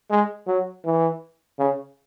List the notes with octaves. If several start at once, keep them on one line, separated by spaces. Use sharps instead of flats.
G#3
F#3
E3
C#3